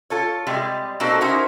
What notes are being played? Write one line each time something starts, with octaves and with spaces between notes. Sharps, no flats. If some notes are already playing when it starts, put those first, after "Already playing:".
F4 A4 C#5
C3 G3 G#3
B2 A#3 C4 D#4 F#4 A4
C#4 D#4 E4 F#4 A#4 C5